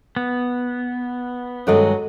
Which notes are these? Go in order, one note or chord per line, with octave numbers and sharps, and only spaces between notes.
B3
G2 D#3 F#3 G#3 C#4 A4 D#5